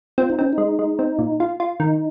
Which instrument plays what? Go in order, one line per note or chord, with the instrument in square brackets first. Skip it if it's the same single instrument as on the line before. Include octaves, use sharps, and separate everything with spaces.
[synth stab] C4 [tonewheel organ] F4
[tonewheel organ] D#4
[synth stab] C4 [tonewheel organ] C#4
[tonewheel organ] D#4
[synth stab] G#3
G#3
C4
A#2
F4
F4
[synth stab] D#3 [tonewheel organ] D#4